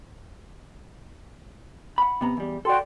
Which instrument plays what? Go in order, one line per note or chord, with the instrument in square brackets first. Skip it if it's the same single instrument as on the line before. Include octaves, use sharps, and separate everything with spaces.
[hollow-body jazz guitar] F#5 B5
C3 B3 A#5
E2 G3
[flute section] F#4 G5 C6 [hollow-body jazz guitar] A4 D5